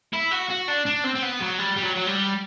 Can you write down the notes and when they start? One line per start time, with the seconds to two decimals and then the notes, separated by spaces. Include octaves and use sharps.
0.13 E4
0.31 F#4
0.50 F#4
0.68 D4
0.86 D4
1.04 C4
1.15 C4
1.22 B3
1.41 F#3
1.59 G3
1.77 G3
1.83 F#3
1.95 F#3
2.07 G3